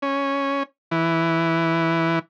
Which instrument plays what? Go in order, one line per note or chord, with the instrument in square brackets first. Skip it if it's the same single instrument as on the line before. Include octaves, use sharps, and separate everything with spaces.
[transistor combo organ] C#4
E3